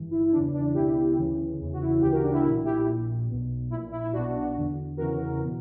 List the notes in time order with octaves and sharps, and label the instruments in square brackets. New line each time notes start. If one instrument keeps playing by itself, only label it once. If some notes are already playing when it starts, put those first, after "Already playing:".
Already playing: [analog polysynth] G1 G2 E3
E4
E4
E2 C#3 E3 D4
D4
C#2 B2 E4 G4
D2 C#3 E3
E2 C#3 E3
F#4
E4
D2 C#3 E3 G4
F#4 A#4
D4
E4
B1 A#2 E4
E4 G4
A#1 A#2
B1 B2
A#1 A#2 E4
E4
E4
B1 B2 D4 F#4
E2 D3
E2 C#3 E3 F#4 A#4
B2